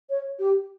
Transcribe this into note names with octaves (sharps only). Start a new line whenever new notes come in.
C#5
G4